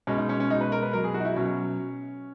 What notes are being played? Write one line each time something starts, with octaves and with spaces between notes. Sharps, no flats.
B2 G#3 C#4
D#4
C#4
C#4
B2 G#3 D#4
B4
A#4
B4
B2 F#3 A#4
G#4
F#4
D#4
E4
B2 F#3 C#4